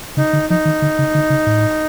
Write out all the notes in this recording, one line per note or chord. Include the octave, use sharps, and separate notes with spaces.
C#3 D#4
D3
F3 D#4
D#3
D3
C#3
D3
C#3
A2